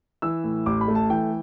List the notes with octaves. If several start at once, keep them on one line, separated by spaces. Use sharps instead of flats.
E3 E6
A2
A1 D6
B5
A3
A5
E3 G5